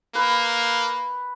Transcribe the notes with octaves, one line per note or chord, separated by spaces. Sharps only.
A#3 B4